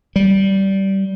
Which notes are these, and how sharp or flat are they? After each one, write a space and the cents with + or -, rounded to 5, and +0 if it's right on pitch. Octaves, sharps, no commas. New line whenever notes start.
G3 -15